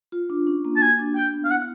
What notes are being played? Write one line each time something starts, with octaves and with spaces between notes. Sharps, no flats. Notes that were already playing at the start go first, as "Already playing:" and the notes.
F4
D4
C#4
A#3
A5
F#4 G#5
D4
D4 G5
B3
F5
E4 F#5